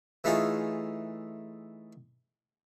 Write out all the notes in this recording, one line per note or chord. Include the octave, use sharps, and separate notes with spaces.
E3 A3 D#4 F4 G#4 C#5